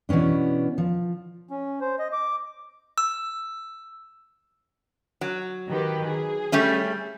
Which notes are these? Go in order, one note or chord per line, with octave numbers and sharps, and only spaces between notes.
B2 E3 B3 C#4 D4
F3
C#4
C5
D#5
D6
E6
F#3
D#3 G4 B4
G#4
G3 A3 C#4